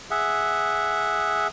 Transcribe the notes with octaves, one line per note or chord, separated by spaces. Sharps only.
G#4 E5 F#5